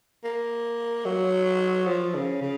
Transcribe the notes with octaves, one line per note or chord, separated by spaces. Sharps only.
A#3
F#3
F3
C#3
C#3